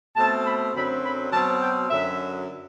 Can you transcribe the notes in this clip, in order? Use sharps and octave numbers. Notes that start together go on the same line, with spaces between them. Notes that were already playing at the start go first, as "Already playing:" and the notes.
B2 A3 C4 A5
B5
F#2 D3 F#3 C4 B5
B5
B2 F#3 C4 A5
G5
F#2 D3 F#3 E5